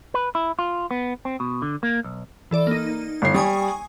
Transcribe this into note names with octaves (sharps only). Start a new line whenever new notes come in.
B4
E4
F4
B3
C4
B2
D3
A#3
B1
E3 A4 D5
A#3 D#4
G1 C7
G3 G#5 C#6 D#6